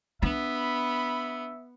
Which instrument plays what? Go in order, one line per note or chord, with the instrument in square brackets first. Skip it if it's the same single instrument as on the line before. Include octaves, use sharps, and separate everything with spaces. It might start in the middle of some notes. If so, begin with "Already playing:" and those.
[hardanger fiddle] B3 [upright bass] D4 [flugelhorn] E5 [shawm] B5